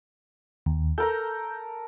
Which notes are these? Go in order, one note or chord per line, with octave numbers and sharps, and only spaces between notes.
D#2
A4 A#4 A#5 G6